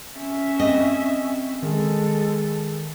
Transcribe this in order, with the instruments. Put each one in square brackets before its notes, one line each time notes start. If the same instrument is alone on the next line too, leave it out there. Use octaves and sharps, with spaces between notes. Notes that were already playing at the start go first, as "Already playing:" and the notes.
[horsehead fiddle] C#4 E5
[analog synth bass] C4 [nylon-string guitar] D#5
[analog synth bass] D#3 [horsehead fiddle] G#3 A4